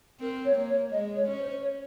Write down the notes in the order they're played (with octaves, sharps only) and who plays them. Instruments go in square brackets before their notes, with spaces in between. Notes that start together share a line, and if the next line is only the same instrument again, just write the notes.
[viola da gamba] C4 [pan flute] A#4
[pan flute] C#5
[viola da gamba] A#3
[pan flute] C#5
[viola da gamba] G#3 [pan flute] D#5
[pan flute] C#5
[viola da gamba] C#4
[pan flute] C5
C#5